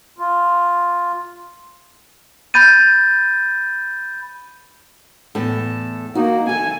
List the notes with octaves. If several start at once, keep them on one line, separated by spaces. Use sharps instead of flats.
F4
B5 G6 A6 D#7
E2 A2 A4
A#3 D#4 F#4
A4 G#5